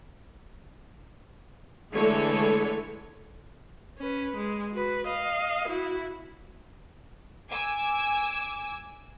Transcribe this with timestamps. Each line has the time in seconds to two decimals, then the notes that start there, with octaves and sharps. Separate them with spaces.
1.94 D3 E3 G#3 A3 A4 C#5
3.99 C#4 B4
4.36 G#3
4.72 F#4 B4
5.07 D#5 F5
5.68 E4 F#4
7.49 G#5 D6 E6